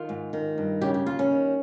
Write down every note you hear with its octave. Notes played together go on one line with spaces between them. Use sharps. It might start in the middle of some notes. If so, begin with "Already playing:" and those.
Already playing: D#3 F4
G#2
D#3
G2
C#3 G4
G4
D#2 F4
C#4
D#3